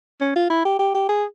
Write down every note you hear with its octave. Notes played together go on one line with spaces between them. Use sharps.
C#4
F4
E4
G4
G4
G4
G#4